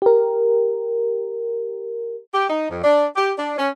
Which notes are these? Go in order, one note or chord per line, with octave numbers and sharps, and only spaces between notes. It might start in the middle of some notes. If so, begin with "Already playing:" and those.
G4 A#4
G4
D#4
F2
D4
G4
D4
C#4